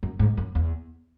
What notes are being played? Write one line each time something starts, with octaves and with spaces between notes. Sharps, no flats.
F#2
G#2
F#2
E2